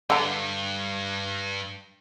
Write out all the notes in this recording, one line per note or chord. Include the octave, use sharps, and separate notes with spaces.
G2 D3 A#5